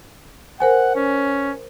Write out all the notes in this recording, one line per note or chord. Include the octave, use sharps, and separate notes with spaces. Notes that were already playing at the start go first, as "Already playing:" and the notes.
A#4 C5 F#5 G#5
C#4